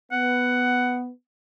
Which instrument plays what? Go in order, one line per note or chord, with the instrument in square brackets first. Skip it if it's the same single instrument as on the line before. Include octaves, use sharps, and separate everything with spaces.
[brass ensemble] B3 [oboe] F#5